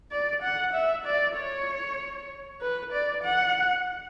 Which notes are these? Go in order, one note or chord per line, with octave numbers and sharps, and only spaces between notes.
D5
F#5
E5
D5
C#5
B4
D5
F#5